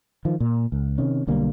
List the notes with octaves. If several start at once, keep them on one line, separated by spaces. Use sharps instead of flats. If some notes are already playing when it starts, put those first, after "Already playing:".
D#3 F3
A#2
C#2
C3 D#3 C#4
B1 D3 G3 A#3